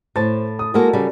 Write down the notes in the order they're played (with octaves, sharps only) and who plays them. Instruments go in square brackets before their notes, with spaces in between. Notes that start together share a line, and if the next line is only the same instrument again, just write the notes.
[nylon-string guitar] A2 A5 [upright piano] C5 A6
[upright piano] D#6
[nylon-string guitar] G#3 A#3 [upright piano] F#4 A4 A#4
[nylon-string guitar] C#3 G3